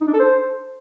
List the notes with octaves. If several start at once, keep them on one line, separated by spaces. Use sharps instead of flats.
D#4
D4
A4
C5